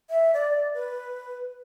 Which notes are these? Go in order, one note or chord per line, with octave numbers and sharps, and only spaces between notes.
E5
D5
B4